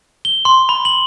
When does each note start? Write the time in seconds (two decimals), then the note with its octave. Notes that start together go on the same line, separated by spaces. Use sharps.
0.25 G7
0.45 C6
0.69 B5
0.85 F#7